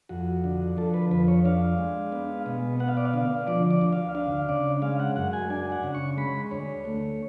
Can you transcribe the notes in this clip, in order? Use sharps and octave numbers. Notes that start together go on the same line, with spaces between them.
F2 F#4
D3
F3 A4
B4
F2 B4
C#5
D4 F5
G#3
B3
B2
B3 F#5
F5
D5
F5
D3
F3 D5
D5
D2
F5
D4 F5
C#3 D5
G#3 F5
F#5
F#2 F#5
G#5
D4 G#5
F#5
C#3
C#6
G#3 B5
D2 C#5
A3